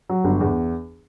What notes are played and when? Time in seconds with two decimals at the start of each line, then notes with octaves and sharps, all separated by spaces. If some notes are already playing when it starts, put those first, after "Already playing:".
0.09 F#3
0.24 G1
0.40 E2